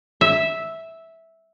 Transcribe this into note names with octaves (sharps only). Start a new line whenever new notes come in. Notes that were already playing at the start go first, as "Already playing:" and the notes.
E5